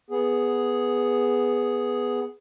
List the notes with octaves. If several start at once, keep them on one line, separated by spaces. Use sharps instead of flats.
B3 G#4